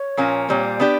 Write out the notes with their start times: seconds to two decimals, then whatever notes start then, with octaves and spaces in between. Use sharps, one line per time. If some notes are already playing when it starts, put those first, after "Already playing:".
Already playing: C#5
0.17 A#2 F3 A#3 C#4
0.48 A#2 G3 C4 C#5
0.64 D5
0.80 B3 D4 G4